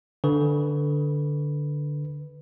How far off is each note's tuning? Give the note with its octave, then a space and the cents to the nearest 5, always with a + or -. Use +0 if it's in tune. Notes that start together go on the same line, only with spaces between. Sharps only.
D3 +0 B4 +0